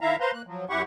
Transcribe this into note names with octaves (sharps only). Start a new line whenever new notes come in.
D#3 E4 E5 F5 A#5
B4 C5 F5 A#5 C6
A#3 F#6
F3 F#3
F#2 E4 G4 F#5 C#6